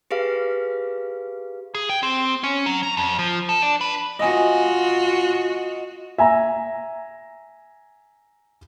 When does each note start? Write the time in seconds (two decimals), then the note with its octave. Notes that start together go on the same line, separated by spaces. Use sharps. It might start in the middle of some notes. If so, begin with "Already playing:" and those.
0.11 G4 G#4 B4 F5
1.75 G#4
1.89 G5
2.03 C4
2.43 C#4
2.66 F#3
2.83 A#5
2.97 F2
3.19 F3
3.49 A4
3.63 D4
3.81 B4
4.19 F4 F#4 D#5 G#5
6.18 E5 G#5 A#5